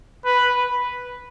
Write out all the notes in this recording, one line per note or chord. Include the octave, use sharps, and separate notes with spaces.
B4